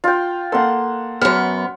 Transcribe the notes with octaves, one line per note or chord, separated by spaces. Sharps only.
F4 G5
A#3 A4 F#5 C6
F#2 B3 F6